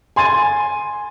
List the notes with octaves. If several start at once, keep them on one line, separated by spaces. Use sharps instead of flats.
G#5 C6 G#6 A6 D#7